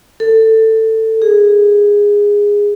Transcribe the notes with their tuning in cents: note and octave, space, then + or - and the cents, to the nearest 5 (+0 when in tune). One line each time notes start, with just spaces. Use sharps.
A4 +15
G#4 -15